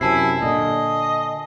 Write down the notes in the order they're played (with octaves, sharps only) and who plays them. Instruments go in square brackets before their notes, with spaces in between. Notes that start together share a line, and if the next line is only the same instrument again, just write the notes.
[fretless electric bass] F#2 C3 [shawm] E4 [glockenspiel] G#5 A5 C7
[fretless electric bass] A#2 D3 [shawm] D#5